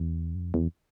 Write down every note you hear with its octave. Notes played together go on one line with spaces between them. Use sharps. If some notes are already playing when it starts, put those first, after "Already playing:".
Already playing: E2
F#2
F2
E2